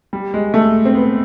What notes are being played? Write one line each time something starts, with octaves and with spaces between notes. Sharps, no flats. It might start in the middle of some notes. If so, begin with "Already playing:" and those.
G3
G#3
A3
C4
B3